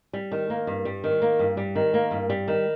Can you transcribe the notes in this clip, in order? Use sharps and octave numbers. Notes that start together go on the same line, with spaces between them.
G3
D#3
A#3
G2
G3
D#3
A#3
G2
G3
D#3
A#3
G2
G3
D#3